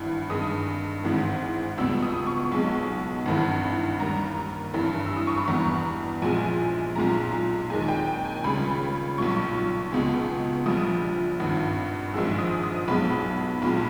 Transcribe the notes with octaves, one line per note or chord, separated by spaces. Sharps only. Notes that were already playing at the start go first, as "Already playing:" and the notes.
Already playing: G#1 G2 E3
G2 D#3 G#3 D#6
G#1 G#2 E3
C#2 B2 G3 E6
D#6
C#6
B1 B2 G#3
G#1 G2 E3
D#2 D#3 G3 A#5
G2 E3 G3
E6
D#6
C#6
B5
E2 B2 G3 A#5
A#1 A#2 G#3 G#5
B1 A#2 G#3 A#5
D#2 D#3 G#3 G#5
G5
G5
G#5
C#2 C#3 G3 B5
B1 A#2 G3 C#6
C#2 B2 G#3
A#1 A#2 G3 D#6
G#1 G2 D#3
A#1 G#2 D#3 G#3 E6
D#6
D#6
B1 B2 G#3 B5
B1 A#2 G#3 B5